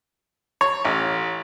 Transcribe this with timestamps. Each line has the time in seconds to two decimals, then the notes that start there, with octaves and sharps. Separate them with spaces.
0.61 C#5
0.85 A1